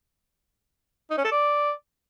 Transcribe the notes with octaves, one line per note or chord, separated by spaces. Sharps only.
D#4
C#4
A4
D5